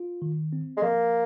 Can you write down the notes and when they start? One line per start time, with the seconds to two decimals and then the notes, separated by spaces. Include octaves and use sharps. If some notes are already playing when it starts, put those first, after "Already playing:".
Already playing: F4
0.22 D#3
0.53 C4
0.77 G#3
0.82 F3 A#3